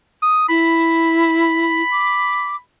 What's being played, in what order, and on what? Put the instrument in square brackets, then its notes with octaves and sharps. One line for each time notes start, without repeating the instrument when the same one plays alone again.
[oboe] D#6
[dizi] E4 [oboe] B5
[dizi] D6